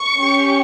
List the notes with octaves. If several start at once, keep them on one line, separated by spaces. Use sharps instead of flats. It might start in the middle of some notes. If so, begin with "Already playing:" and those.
Already playing: C#6
C#4 G4